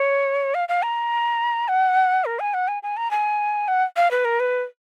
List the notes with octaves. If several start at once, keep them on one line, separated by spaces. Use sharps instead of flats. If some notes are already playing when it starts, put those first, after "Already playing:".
Already playing: C#5
F5
F5
A#5
F#5
A#4
G#5
F#5
G#5
G#5
A#5
G#5
F#5
F5
B4
A#4
B4